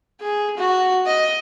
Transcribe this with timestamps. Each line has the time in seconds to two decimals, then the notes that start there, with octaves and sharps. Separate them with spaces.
0.21 G#4
0.57 F#4
1.06 D#5